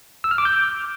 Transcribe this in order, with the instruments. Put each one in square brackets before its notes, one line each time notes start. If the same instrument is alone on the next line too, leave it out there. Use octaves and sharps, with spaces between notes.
[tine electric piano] E6
F6
D6
G6